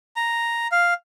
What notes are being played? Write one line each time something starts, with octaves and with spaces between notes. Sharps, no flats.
A#5
F5